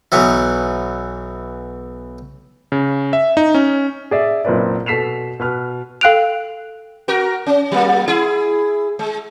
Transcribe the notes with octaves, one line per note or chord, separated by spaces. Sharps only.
B1 E3 F#3 B3 E4
C#3
E5
D#4
C#4
G#4 D5 E5
F#1 A#2 C4 B4 D5
B2 A4 B6 C7 E7 F7
B2 B4 F6
A4 F5 G5 F#6 D7 F7
F#4 A#4
C#4
F#3 A#3
E4 G#4
G#3